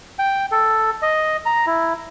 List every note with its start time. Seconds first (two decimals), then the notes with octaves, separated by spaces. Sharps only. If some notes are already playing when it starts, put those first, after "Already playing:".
0.19 G5
0.52 A4
1.02 D#5
1.46 A#5
1.66 E4